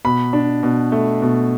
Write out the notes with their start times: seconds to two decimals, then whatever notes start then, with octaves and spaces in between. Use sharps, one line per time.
0.05 B2 B5
0.33 D4
0.63 B2
0.92 A3
1.22 B2